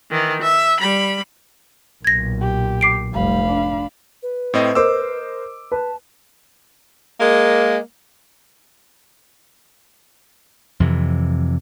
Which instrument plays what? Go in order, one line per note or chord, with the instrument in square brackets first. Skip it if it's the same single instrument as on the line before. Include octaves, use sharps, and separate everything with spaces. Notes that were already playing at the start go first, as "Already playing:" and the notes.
[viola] D#3 E3
E5
G3 B5
[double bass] B1 A#2 [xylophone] G#6 A#6
[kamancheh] G4
[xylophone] D6 C7 D7
[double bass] F1 G3 [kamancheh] F5 B5
[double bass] D4
[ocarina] B4
[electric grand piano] A2 C4 D#5
[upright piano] A#4 C5 D#5 [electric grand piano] D6 E6
[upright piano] B4 [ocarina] A5
[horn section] G#3 A#3
[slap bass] F2 C3 E3